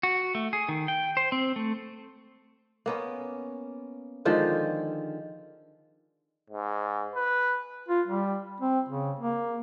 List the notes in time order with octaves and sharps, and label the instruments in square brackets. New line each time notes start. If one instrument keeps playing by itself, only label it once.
[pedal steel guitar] F#4
A3
G#4
D#3
G5
C5
C4
A3
[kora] A#3 B3 C#4
D3 D#3 F3 G#3
[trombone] G#2
B4
[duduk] F4
G3
C4
C#3
A#3